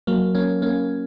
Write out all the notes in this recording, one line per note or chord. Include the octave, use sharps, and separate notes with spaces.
F#3 A#3
A#3 C#4
A#3 C#4